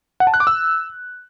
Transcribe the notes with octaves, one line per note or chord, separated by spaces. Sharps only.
F#5
A5
F#6
D6
E6